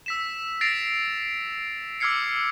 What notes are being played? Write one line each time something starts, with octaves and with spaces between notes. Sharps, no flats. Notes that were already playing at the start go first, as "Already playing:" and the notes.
E6 B6 E7
A6 A#6 C7 D7 F7
D6 E6 F6 G#6 C7 C#7